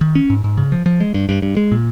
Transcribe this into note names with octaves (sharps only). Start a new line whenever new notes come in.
D#3
C#4
G#2
G#2
C#3
F3
F3
G#3
G2
G2
G2
G#3
A#2